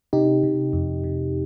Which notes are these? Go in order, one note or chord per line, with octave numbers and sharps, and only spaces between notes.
C3 D#4 G4
C3
F2
C3